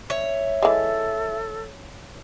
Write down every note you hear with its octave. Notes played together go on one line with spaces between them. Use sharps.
C#5 E5
E3 G#3 A4